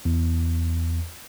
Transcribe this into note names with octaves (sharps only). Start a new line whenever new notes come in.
E2